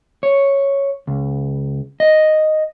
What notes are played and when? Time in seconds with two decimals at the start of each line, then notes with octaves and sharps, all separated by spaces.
0.23 C#5
1.07 C#2
2.00 D#5